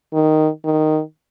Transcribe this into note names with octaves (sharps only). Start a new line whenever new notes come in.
D#3
D#3